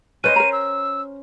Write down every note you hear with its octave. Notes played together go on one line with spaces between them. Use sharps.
C#4 B4 C5 D5 D#5 D#7
A#4 A#5
E6